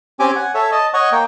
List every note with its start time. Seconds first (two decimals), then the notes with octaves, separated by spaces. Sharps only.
0.20 C4 C#4 G4 G#5 D6
0.36 F#5 G#5
0.54 A4 C#5 E5
0.72 D#5 A5
0.94 C#5 D#5 F#5 C#6
1.12 A#3 G5